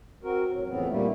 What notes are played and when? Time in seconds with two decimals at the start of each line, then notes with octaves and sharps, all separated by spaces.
0.24 C4 F#4 A#4
0.52 A2 F#3
0.67 F2 A2 C#3 E3 B3 C4
0.89 A#2 D3 G3 A3 A#3